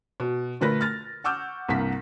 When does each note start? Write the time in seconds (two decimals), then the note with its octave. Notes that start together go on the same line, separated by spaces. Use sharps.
0.20 B2
0.60 A#2 D3 A3 A#4 B4 A#6
0.81 F6 A6
1.24 F#5 C#6 D6 E6 F6 G6
1.68 C2 G2 A#3 F#5 B6